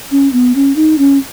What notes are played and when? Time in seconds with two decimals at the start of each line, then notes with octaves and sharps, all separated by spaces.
0.11 C#4
0.33 B3
0.55 C#4
0.76 D#4
0.98 C#4